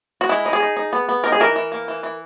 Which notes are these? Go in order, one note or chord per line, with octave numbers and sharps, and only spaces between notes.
F#4
G#3 E4
D#4
G#4
D#4
D#4
B3
B3
D#4 A#4
G#4
E3 A#4
E3
A#3
E3
E3